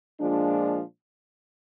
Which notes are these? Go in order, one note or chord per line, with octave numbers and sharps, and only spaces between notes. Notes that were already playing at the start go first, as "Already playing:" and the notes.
A#2 F3 G#3 D4